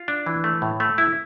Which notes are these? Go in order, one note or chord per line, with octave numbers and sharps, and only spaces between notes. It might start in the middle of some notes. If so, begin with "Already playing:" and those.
Already playing: F4
D4
E3
A3
A2
A3
E4